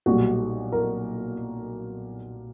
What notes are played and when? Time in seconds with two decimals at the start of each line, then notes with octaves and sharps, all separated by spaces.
0.06 B1 A#2 G3 F#4
0.72 A#4